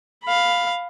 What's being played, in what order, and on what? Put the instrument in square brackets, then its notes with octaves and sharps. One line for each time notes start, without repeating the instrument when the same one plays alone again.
[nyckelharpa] F5 B5